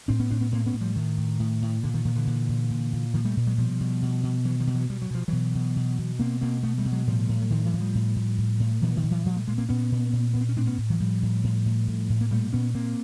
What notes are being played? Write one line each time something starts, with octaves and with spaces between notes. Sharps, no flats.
A2 C4 D4
B3 C#4
A2 C4 D4
B3 C#4
A2 A#3 C4
B3 C#4
A2
F3 G3
A2 D#3
A2
A2
A2
A#2 D3
D#3
A#2 D#3
D3 E3
A#2
A#2
A#2
A#2
A#2 D#3 F3
G3 A3
A#2
F#3 G#3
B2 F3 G3
B2
B2
B2
B2 E3 F#3
D#3 F3
B2 G3
E3 F#3
B2 G3
F#3
B2 F3
B2 E3 F#3
B2
B2
B2
B2 A#3 C4
B2 A#3 C4
B2 A3 B3
G3 A3
B2
F#3 G#3
A2 F3 G3
A2
F#3
A2 D#3 F3
E3 F#3
A2
F3 G3
A2
A2
A2
A2
A#2 E3 F#3
D#3 F3
A#2
E3 F#3
A#2 F3 G3
G3 A3
A#2 G#3 A#3
A#3 C4
A#2 B3 C#4
A#2
A#2
A#2 B3
C4
C#4
A2 C4 D4
B3 C#4
A2
E3 F#3
A2 F3 G3
A2
A2
A2
A2
A2
A#3
A#2 G3 A3
A#2 B3 C#4
A#2 A#3 C4